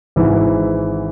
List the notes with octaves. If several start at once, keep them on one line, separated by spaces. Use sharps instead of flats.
G#1 G#2 E3